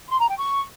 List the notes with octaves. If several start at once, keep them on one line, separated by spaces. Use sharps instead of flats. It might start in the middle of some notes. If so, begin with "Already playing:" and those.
C6
A#5
G5
C#6